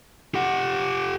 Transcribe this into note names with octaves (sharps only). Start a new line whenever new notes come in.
G4 F#5